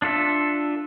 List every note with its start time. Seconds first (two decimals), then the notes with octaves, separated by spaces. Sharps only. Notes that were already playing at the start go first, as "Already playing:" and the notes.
0.02 D4 F4 A4 E5